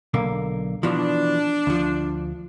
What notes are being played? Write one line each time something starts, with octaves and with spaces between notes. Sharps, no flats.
B1 D3 A#3
B2 E3 F3 D4
D2 F3